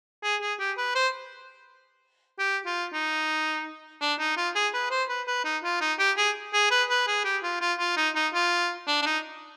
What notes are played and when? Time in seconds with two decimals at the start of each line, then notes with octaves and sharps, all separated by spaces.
0.23 G#4
0.41 G#4
0.60 G4
0.78 B4
0.95 C5
2.39 G4
2.66 F4
2.93 D#4
4.02 D4
4.19 D#4
4.37 F4
4.55 G#4
4.74 B4
4.91 C5
5.09 B4
5.28 B4
5.45 D#4
5.64 F4
5.81 D#4
5.99 G4
6.18 G#4
6.54 G#4
6.71 B4
6.90 B4
7.08 G#4
7.25 G4
7.44 F4
7.61 F4
7.80 F4
7.97 D#4
8.16 D#4
8.34 F4
8.88 D4
9.02 D4
9.06 D#4